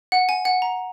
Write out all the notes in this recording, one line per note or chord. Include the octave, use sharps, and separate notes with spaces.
F#5
G#5
F#5
A#5